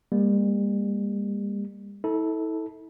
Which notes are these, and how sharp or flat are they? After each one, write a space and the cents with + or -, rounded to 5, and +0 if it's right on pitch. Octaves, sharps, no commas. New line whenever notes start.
G3 +40 A#3 +0
E4 -40 A4 +0